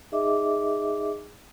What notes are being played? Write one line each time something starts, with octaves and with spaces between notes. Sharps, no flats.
D#4 G#4 D#5 E5 D6